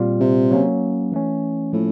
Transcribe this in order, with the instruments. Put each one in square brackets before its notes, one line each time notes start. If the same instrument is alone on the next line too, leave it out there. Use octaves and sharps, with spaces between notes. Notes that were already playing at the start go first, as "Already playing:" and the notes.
Already playing: [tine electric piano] A#2 G3 C4 F4
[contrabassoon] C3
[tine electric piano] F#3 A#3 C#4
E3 A3 C#4
[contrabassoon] A2 [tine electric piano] F3 A#3 C#4 F4